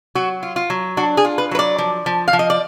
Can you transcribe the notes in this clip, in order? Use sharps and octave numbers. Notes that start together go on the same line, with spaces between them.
F#3 F#4
F4
F4
F#3
D4 F#4
G#4
F4
B4
F#3 B4
D5
F3
F3
F5
F3
D#5
D5